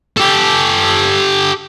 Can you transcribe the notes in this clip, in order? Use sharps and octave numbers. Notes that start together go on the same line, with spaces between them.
G4 A4